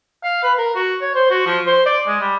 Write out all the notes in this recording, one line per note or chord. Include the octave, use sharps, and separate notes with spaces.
F5
B4
A#4
F#4
C#5
C5
F#4
F3
C5
D5
G#3
G3